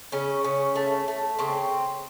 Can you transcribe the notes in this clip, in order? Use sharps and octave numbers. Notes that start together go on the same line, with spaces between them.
C#3 C#4
C#3
A3
A3
C#3 C4